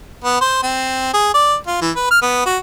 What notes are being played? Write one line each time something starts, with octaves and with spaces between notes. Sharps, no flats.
B3
C5
C4
G#4
D5
F4
E3
B4
F6
B3
F#4